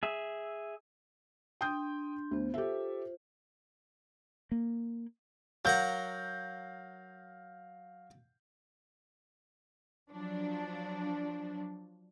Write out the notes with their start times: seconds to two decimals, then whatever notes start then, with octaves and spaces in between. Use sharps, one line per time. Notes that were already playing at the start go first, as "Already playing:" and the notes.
0.03 G#4 E5
1.61 D4 G5 C6 D#6 G6
2.31 D2 B3 C5
2.54 F4 G4 A4 C5 E5
4.51 A#3
5.65 F#3 A#4 F5 F#5 G6
10.11 F3 F#3 D4